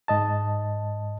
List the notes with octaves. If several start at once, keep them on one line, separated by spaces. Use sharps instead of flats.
G#2 D#5 A5